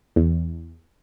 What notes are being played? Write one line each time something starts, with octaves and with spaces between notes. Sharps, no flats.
E2